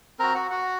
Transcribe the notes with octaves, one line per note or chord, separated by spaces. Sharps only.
C4 F#4 A#4 A#5
F#4 F#5
F#4 F#5